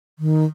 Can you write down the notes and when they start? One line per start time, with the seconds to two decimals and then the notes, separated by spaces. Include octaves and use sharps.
0.19 D#3